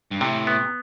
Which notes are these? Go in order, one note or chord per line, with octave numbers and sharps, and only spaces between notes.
G2
A2 C3
B3